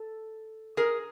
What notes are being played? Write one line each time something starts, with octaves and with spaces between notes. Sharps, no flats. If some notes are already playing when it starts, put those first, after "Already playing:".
Already playing: A4
G#4 A#4